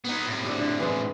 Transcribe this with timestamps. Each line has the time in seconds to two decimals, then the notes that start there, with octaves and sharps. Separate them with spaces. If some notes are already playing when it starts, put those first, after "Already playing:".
0.05 B3 D#4
0.26 A2 C3
0.45 D4 A4 D#5
0.58 D3
0.80 E3 G#3